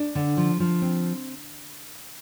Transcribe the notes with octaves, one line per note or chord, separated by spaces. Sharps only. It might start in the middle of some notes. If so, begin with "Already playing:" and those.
Already playing: D4
D3
F3
F3
C4